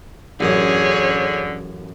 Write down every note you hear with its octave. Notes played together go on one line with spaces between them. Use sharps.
A1 F#2 D3 G#4 C#5 D#6